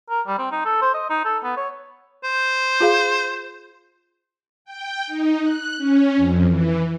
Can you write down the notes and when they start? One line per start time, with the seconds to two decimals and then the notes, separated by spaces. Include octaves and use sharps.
0.10 A#4
0.27 G3
0.38 C4
0.51 D#4
0.65 A4
0.82 C5
0.94 D#5
1.10 D#4
1.25 A4
1.44 B3
1.57 C#5
2.24 C5
2.80 F4 G#4 F5
4.65 G5
5.07 D#4
5.42 F#6
5.77 C#4
6.17 F2
6.46 E3